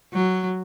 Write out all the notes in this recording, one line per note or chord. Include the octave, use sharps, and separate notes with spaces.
F#3